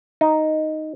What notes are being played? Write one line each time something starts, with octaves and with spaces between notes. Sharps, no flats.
D#4